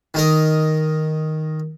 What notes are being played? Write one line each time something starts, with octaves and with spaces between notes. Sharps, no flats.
D#3 D#4 A#4